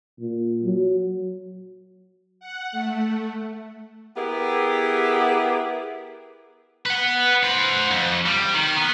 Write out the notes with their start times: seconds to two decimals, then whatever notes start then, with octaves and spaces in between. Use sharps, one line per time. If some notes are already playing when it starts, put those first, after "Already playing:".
0.19 A#2
0.63 F#3
2.40 F#5
2.72 A3
4.16 B3 E4 G4 G#4 A#4
6.86 B4 F#5
7.43 C5 F#5
7.91 F2
8.26 G3
8.54 D#3
8.77 B3